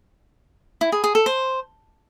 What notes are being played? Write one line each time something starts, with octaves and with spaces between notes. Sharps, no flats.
E4
G#4
G#4
A4
C5